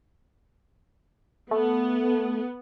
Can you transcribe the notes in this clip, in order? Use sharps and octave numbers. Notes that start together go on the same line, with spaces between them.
A3 B3